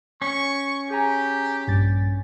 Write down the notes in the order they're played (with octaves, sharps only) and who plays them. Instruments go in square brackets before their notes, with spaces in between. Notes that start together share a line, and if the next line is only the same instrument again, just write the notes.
[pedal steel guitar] C#4 [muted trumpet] C#6
[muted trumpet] G4 [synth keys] G#4 G#5 A#5
[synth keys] A#1 G2 A6